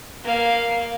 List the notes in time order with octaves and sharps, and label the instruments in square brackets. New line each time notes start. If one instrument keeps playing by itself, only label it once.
[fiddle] A#3 F5